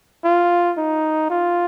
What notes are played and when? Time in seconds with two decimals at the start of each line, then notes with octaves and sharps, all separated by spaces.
0.24 F4
0.77 D#4
1.30 F4